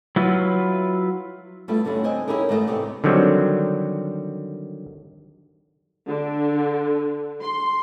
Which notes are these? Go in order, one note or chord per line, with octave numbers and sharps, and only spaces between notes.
F#3 E4 F4 B4
G3 A3 B3 E4 F4 G4
G2 D3 G3 C#4 E4 F#4
D3 C4 D#5 G#5
C#4 D#4 E4 G4 G#4 A#4
G#2 E3 G#3 A3 A#4 D#5
E2 C3 G4 D5
D3 D#3 F#3 G3 C4
D3
C6